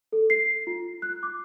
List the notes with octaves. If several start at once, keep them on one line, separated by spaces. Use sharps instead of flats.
A4
C7
F4
F#6
D6